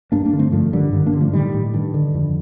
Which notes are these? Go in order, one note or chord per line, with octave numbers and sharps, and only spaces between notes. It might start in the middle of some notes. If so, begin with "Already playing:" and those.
G2 A#3 D4
A#3 D4
D3
A3 C4
G2 F3 A3
D3 D#3 G3
G2 D#3
A#3 D4
D3
F3 A3
A2 D#3 G3
A2
G2 D#3
D3
F2